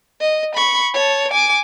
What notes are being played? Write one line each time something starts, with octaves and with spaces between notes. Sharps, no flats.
D#5
B5 C#6
C#5 A5
G#5 D6